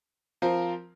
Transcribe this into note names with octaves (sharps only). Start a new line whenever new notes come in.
F3 C4 F4 A#4